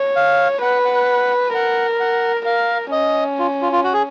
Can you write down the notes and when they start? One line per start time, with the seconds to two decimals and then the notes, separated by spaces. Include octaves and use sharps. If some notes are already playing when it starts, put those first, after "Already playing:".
Already playing: C#5
0.16 F5
0.62 B4 F#5
0.85 F#5
1.54 A#4 F#5
2.00 F#5
2.46 A#4 F5
2.92 C#4 D#5
3.39 F4
3.62 F4
3.72 F4
3.84 F#4
3.93 G#4